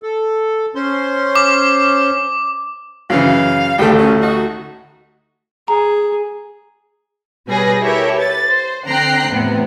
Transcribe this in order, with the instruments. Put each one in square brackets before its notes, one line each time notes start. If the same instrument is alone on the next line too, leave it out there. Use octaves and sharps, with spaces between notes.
[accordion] A4
C#4 C5 C6
[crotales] D6
[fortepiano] F#2 C#3 E3 [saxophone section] F5
[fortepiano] A1 D2 A3 [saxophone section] G3 G4
[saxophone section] A#2 C#3 C#4
D#4 F#4
[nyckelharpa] G#4 [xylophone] A#5
[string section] B2 G3 G#4 B4 C#5 A#6
E4 G4 A4 A#4 C#5 E5
B4 A6
C5
D3 C4 G5 A#5 F#6 C7
E2 A2 C3 B3